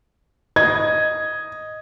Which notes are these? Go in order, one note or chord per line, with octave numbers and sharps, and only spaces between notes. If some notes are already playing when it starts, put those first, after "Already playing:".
D#5 G#6